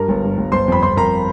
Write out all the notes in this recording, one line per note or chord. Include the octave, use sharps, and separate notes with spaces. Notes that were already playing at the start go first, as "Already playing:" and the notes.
Already playing: G2 A#4 A#5
G1
G2
G1
G1 C5 C6
F2 B5
F2 C5 C6
F2 A#4 A#5